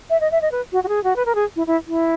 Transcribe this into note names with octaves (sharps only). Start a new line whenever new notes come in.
E5
D#5
E5
D#5
B4
F#4
F#4
G#4
F#4
B4
A#4
G#4
E4
E4
E4